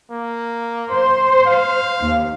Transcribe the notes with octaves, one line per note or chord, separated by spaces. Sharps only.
A#3
C5
F5
D#2